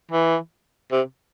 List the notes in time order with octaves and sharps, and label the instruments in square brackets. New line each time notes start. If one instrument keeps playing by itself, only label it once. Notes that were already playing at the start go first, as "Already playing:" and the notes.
[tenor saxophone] E3
C3